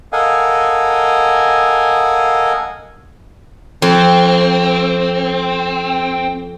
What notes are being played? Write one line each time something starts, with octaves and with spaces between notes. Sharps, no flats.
A4 A#4 D#5 F5 F#5 G#5
F2 C4